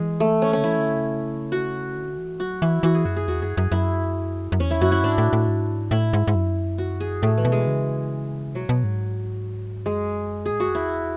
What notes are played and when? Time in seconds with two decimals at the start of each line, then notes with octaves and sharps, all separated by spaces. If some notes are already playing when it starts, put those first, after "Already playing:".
Already playing: E3 G#3
0.20 A3
0.42 C#4
0.53 D3 C#4
0.63 E3 E4
0.78 D3
0.94 C#3
1.52 F#4
1.96 D3
2.18 E3
2.40 F#3 F#4
2.62 E3 E4
2.83 E3 F#4
2.95 G#4
3.05 F#2 F#4
3.16 G#4
3.28 E2 F#4
3.42 F#2 G#4
3.57 F#2 G#4
3.72 F#2 E4
4.52 F#2
4.59 E2 C#4
4.71 E4
4.81 F#2 F#4
4.92 E4
5.03 G#2 D4
5.18 A2
5.33 A2
5.47 G#2
5.91 A2 E4
6.13 G#2
6.28 G#2
6.35 F#2
6.78 F#4
7.00 G#4
7.22 A2 A3
7.38 E3
7.45 B2
7.52 G#3
7.67 C#3
8.55 B2 F#3
8.69 B2
8.84 G#2
9.86 F#2 G#3
10.46 G#4
10.51 A2
10.59 G#2 F#4
10.67 F#2
10.74 E2 E4